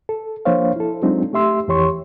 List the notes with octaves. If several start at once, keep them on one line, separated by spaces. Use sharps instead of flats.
A4
F3 A#3 D4 C5 C#5 F5
E4 A4
F#3 G#3 C4 D4 D#4 F4
A3 G4 E5 C6 E6
F2 E3 G4 C#5 C6 C#6